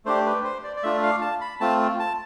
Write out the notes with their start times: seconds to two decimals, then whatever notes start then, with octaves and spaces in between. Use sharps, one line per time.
0.05 A3 D4 G4 C5
0.26 B4
0.44 C5
0.64 D5
0.77 D5
0.83 A3 D4 F4 E5
1.03 F5
1.21 A5
1.41 B5
1.60 A3 C4 F4 A5
1.99 A5